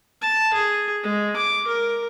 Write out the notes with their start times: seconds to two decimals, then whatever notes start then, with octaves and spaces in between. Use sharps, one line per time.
0.21 A5
0.53 G#4
1.03 G#3
1.36 D6
1.67 A#4